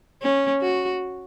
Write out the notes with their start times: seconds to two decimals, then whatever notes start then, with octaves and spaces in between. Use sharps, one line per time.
0.23 C#4
0.62 F#4